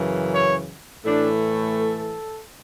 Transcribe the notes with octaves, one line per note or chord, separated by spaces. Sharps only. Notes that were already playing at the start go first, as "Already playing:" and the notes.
Already playing: F#2 C#3 E3
C#5
A2 E3 A3 D4
A4